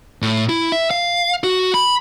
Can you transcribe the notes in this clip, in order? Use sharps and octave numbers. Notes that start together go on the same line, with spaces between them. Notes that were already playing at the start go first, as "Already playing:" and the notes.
A2
E4
E5
F5
F#4
B5